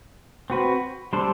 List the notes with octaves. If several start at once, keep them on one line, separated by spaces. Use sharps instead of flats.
C4 F#4 B4
G3 D4 A4 C5